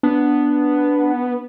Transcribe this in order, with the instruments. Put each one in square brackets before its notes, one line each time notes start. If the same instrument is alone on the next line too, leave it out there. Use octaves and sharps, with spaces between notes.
[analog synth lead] B3 [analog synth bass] D4